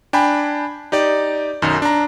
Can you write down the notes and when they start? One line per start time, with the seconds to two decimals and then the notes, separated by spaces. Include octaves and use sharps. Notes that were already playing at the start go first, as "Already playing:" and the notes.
0.13 D4 G5 G#5 B5
0.92 D#4 G4 D5
1.62 B1 F#2 D#3
1.82 D4 A#5